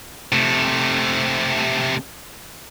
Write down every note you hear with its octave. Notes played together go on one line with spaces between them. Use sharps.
C3 A3